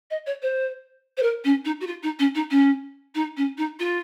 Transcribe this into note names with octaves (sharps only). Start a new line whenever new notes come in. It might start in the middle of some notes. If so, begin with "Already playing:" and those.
D#5
C#5
C5
C5
A#4
C#4
D#4
F#4
F4
D#4
C#4
D#4
C#4
D#4
C#4
D#4
F4